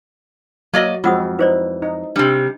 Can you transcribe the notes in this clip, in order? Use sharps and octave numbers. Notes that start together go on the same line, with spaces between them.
F#3 A#3 D5 D#5
F2 G#3 C4 F4 F#4 F#5 D#6
D#4 E4 B4 C5 D5
D#4
C3 G3 D4